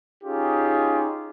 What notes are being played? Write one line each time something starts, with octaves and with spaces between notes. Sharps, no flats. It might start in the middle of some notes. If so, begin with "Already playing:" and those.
C#4 D#4 F4 G4 G#4